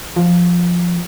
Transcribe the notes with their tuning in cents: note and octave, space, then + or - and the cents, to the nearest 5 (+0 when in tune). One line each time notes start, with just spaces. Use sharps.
F3 +5